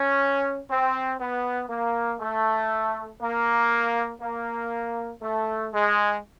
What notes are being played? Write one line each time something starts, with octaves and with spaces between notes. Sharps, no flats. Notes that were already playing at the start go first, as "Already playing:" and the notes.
Already playing: C#4
C4
B3
A#3
A3
A#3
A#3
A3
G#3